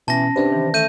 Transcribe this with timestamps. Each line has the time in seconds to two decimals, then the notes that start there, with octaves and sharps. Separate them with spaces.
0.08 B2 E3 C#4 A5 A#6
0.36 C3 D4 B4 C5
0.50 D#3 E3
0.74 A3 G6 D#7